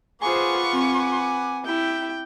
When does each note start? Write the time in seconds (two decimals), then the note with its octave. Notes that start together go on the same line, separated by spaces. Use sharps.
0.22 F4 G#4 B4 C5 F#5 G#5 C#6 D6
0.73 C4 G#5
1.65 E4 G4 G5